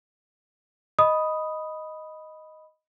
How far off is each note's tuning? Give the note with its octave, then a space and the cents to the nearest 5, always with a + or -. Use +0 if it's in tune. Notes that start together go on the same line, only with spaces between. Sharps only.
D#5 +0 B5 +0 D#6 +0